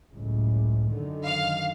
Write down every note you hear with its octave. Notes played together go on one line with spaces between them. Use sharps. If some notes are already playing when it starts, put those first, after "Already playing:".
F#1 C#2 A2
F#2 D3 D#3
F5